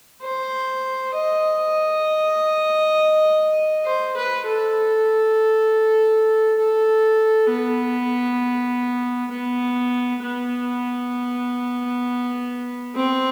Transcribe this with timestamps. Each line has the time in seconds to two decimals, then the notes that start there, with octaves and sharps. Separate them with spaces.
0.22 C5
1.14 D#5
3.85 C5
4.17 B4
4.46 A4
6.59 A4
7.50 B3
9.31 B3
10.22 B3
12.95 C4